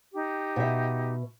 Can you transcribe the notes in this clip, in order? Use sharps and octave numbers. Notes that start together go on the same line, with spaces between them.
D#4 G4
B2 E5